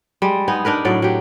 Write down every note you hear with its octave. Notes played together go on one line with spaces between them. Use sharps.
G3 G#3
B3 D#4 G#4
D4 D#4 A#4 B4
A2 F#3 D5
F#3 G4